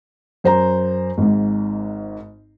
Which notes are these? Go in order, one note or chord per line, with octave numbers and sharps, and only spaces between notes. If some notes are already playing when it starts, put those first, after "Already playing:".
F#2 C5 A#5
G#1 G#2